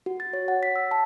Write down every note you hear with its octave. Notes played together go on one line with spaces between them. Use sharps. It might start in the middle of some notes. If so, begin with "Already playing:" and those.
F#4
A6
C#5
F#5
B6
E6
A5